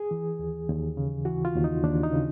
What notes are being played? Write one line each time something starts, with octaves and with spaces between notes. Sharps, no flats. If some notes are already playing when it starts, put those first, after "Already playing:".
Already playing: G#4
E3
D#2
D#2
C#3
E3 F#4
F4
D#2
D#4
D#2 D4
D#4
C#3